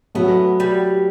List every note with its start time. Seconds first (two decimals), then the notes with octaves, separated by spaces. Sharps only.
0.15 F#3 A3 B3
0.60 G3